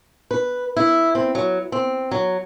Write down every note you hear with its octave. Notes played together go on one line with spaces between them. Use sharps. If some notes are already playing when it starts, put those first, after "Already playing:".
B4
E4
C4
F#3
C4
F#3